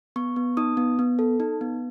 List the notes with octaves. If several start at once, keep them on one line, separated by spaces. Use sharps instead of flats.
B3 C#6
B3
D#4 D#6
B3
B3
A4
D#4
B3